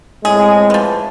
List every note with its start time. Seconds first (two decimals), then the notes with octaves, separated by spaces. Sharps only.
0.25 A2 G#3 C4 G#4
0.70 E3 F3